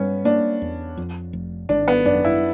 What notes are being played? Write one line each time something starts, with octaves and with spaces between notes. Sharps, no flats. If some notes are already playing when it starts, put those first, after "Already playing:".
Already playing: G2 G3 B3 C#4
A#3 D4
E2
F2
F1
G#1 D4
B3
F#2 D4
E4